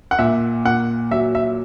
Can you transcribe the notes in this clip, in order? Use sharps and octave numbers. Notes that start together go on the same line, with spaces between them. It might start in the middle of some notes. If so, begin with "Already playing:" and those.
F#5
A#2 E5
A#2 F#5
F#3 E5
E5